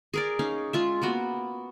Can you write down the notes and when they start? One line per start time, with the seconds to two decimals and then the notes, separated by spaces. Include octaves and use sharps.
0.14 G#4 A#4 D5
0.39 C#4 D#4 F5
0.73 G#3 F4 E5
1.02 A#3 B3 F#4